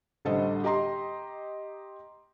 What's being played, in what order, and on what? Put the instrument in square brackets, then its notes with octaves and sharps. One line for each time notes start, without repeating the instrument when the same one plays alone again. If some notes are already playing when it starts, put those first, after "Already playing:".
[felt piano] A1 D3 G3 A4 C5 D#5
G4 D#5 A#5 C6